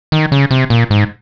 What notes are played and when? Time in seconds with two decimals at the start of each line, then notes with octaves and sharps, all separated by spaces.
0.12 D#3
0.32 C#3
0.51 C3
0.70 A#2
0.91 G#2